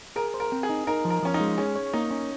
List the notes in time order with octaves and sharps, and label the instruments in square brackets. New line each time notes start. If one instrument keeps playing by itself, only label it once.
[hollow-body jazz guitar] G#4 [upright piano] A#4
[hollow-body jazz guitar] C5
[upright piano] A#4
[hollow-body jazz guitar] C4
[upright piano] G#4
[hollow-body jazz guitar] D#4
[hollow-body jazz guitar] D#4 [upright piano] A#4
[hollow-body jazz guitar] F3
[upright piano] A#4
[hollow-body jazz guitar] F3 [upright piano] C#4
[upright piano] D#4
[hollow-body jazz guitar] G#3
[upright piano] C#4 [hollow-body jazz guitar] G#4
[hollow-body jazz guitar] C#5
[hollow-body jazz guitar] A#3 [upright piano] D#4
[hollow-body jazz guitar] C#4